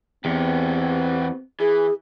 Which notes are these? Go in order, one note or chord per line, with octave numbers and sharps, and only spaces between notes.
E2 B3 C4 G4
E3 G#4